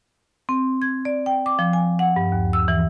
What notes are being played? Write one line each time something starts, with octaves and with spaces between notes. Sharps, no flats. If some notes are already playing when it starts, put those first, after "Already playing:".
C4
G#6
D5
G5
D6
F3
G#5
F#5
G2
D#2
E6
E3